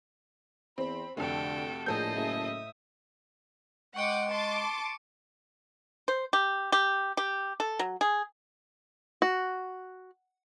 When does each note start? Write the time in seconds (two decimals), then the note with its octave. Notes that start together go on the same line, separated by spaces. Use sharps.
0.78 E2 C4 B5
1.17 F1 F2 D3 F#4 A4 G5
1.86 A#1 A2 G#4 A4 D#5 G6
2.15 F#1 E5 D#6
3.96 G#3 F#5 G5 C#6 D6 C#7 D7
4.31 A5 C6 D6
6.08 C5
6.33 G4
6.72 G4
7.17 G4
7.60 A4
7.79 F#3
8.01 G#4
9.22 F#4